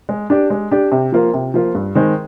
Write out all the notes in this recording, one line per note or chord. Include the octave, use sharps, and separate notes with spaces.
G#3
D4 G4 D5
G#3
D4 G4 D5
C3
F3 A#3 F4
C3
F3 A#3 F4
G2
D#3 G#3 C4